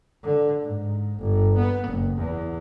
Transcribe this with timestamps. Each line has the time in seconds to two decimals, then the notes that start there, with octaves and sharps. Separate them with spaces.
0.23 D3
0.62 G#2
1.19 G1
1.57 B3
1.88 F#1
2.17 E2